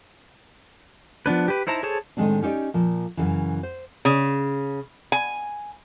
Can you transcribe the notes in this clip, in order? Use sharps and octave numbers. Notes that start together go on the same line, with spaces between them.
F3 B3 D4 B4
G4 B4
D#4 E4 C5 A5 A#5
G#4 A4 C5 C#5 A5
A2 D#3 G#3 C4 D4
C#4 D#4 G4 C5 D5
A#2 F3
F#2 A2 C#3 E3
C5
C#3
G#5